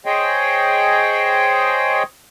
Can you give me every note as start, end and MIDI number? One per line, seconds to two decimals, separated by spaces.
0.06 2.03 68
0.06 2.03 72
0.06 2.03 73
0.06 2.03 75
0.06 2.03 79